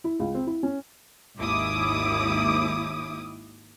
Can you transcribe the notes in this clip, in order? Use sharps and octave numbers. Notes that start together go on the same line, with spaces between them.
E4
C#2
C4
E4
C#4
G#1 D#2 E4 D6 D#6